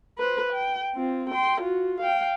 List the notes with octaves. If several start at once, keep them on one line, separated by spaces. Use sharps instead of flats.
B4 C5
G5
C4 F4
G5 C6
F4 F#4
F5 G5